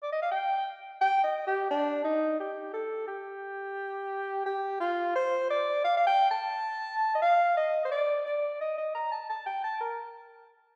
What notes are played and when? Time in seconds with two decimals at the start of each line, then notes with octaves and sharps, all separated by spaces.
0.03 D5
0.12 D#5
0.22 F5
0.31 G5
1.01 G5
1.24 D#5
1.47 G4
1.71 D4
2.04 D#4
2.40 G4
2.74 A4
3.08 G4
4.46 G4
4.80 F4
5.16 C5
5.50 D5
5.84 F5
5.97 F5
6.07 G5
6.31 A5
7.15 D#5
7.22 F5
7.57 D#5
7.85 C5
7.91 D5
8.26 D5
8.61 D#5
8.78 D#5
8.95 A#5
9.12 A5
9.30 A5
9.46 G5
9.64 A5
9.81 A#4